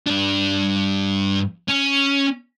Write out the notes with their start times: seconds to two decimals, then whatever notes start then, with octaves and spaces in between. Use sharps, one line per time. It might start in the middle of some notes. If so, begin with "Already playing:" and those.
0.06 G2 D4
1.68 C#4